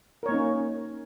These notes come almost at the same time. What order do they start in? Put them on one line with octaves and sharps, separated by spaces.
A#4 C#5 A#3 D#4 C#4